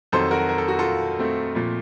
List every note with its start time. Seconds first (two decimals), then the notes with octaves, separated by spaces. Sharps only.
0.12 F2 D#3 F#3 A4 C5
0.31 F#4 A#4
0.49 A#4
0.58 A4
0.68 F#4
0.79 F4 A4
1.19 A3 C4
1.55 A#2 F3